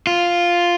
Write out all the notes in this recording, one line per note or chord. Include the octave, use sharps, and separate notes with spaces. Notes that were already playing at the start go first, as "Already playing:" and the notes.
F4